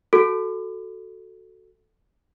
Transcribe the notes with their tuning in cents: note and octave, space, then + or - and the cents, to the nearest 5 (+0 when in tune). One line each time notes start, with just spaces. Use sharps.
F#4 +0 A4 +0